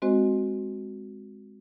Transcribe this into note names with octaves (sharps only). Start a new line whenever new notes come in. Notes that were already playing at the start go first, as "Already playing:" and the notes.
G#3 C4 F#4 C5 D#5